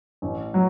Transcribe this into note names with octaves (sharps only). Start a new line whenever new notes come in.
A1
F#3